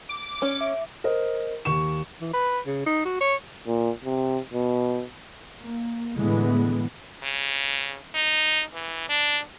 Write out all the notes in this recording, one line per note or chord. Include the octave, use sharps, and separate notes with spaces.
D6
C#4
E5
A#4 C5 D#5
D#2 C#6 E7
E3
B4
C#3
D#4
F#4
C#5
A#2
C3
B2
A#3
A2 D3 E3 G#3 B3
C#3
D#4
E3
D4